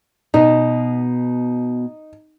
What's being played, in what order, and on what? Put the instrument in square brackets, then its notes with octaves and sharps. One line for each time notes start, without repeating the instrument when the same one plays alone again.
[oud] B2 [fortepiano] D#4